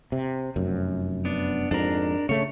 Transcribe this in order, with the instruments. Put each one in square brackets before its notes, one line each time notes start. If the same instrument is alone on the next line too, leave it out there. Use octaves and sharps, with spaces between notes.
[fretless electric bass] C3
F1 F#2
[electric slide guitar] B3 D4
[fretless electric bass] F2 G#2 [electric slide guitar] D4 A#4
[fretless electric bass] C#3 A3 [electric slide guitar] C#5